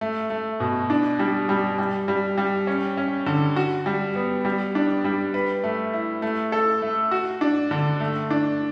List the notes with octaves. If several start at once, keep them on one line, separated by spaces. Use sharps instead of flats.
A3
A3
B2
D4
G3
G3
G3
G3
G3
C#4
C#4
D3
F#4
G3
B3
G3
D4
G3
B4
A3
E4
A3
A4
A3
F#4
D4
D3
A3
D4